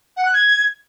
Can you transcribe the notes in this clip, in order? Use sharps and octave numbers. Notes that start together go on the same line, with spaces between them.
F#5
F#6
G#6